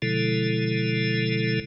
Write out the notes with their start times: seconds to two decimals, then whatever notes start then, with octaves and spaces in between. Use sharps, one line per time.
0.02 B2 D3 F3 G#3 E4 A4